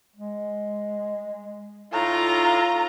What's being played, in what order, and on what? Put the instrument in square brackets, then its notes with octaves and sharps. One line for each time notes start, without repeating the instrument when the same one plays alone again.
[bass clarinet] G#3
[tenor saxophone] A2 [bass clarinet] D#4 [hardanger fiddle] F4 [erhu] A#5